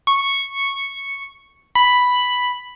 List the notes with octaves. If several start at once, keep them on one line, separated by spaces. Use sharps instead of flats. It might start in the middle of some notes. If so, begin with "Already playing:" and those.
C#6
B5